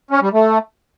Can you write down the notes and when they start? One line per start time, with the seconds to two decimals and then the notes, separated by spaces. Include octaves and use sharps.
0.11 C#4
0.22 G3
0.33 A3